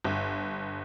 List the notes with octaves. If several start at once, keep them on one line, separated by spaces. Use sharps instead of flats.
G1